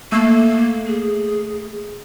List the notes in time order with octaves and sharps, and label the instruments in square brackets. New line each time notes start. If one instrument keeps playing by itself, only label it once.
[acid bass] A3 [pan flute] A#3
[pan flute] G#4